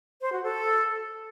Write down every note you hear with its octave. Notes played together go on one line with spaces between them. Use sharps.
C5
F#4
A4